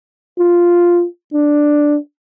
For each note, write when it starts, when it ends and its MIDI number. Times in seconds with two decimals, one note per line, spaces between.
0.39 1.05 65
1.33 1.97 62